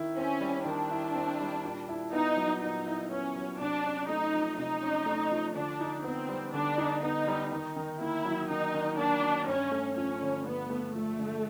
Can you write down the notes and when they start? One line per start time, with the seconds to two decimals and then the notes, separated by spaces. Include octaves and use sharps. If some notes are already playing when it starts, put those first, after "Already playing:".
Already playing: D#3 E4
0.16 C4 C#4
0.41 G3
0.66 D#3 D4
0.91 E4
1.15 C4
1.40 G3
1.65 A#2
1.89 E4
2.13 B3 D#4
2.37 F#3
2.61 A#2 D#4
2.87 E4
3.10 B3 C#4
3.36 F#3
3.60 C3 D4
3.84 C#4
4.08 A3 D#4
4.33 F3
4.58 C3 D#4
4.83 C#4
5.06 A3
5.31 F3
5.55 D3 D4
5.81 D#4
6.04 B3 C4
6.29 G3
6.53 D3 D4
6.78 D#4
7.03 B3 D#4
7.27 G3
7.51 D#3 D#4
7.76 D#3
8.00 A#3 E4
8.25 F#3
8.49 D#3 D#4
8.74 D#3
8.98 A#3 D4
9.23 F#3
9.48 G2 C#4
9.72 A3
9.96 F3 C#4
10.21 D3
10.45 G2 B3
10.70 A3
10.94 F3 A3
11.19 D3